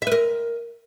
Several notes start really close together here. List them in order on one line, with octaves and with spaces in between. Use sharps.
E5 B4 A#4